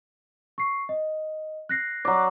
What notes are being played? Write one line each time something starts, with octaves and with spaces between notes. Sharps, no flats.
C#6 C7
D#5
F#6 A#6 C7
F#3 D5